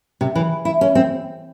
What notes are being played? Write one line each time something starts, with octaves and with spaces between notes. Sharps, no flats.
C3
E3
E4
C#4
C4